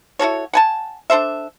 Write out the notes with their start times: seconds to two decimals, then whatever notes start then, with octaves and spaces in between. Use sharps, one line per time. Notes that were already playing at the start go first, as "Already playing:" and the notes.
0.19 E4 F#4 A4 C#5
0.53 F#5 G#5 A5
1.10 D4 A4 C5 E5